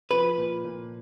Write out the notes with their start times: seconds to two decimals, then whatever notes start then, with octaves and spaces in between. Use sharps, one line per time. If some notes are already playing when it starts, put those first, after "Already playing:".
0.10 F3 B4
0.38 A#2
0.65 A#2